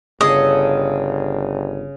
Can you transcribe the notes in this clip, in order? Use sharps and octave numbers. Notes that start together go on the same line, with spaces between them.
G1 C#3 G#4 A4 D#5